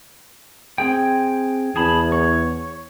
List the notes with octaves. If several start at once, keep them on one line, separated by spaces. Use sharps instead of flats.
C4 G#4 G5
E2 G#4 A5 B5
C#5